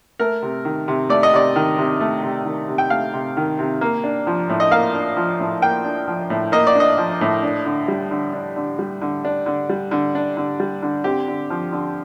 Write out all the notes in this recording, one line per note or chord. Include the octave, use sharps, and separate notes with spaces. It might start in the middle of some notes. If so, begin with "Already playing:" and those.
A3 A#4
C3
D#3
C3
A3 D5
D#5
C3 D5
D#3
C3
A3
C3
D#3
C3
G5
A3 F5
C3
D#3
C3
A#3
D4
F3
A2
D#5
A#3 F5
D4
F3
A2
A#3 G5
D4
F3
A2
A#3 D#5
D5
D4
D#5
F3
A2
D4
D3
G3
D3
D4
D3
G3
D3
D4
D3
G3
D3
D4
D3
G3
D3
C4 G4
D3
F3
D3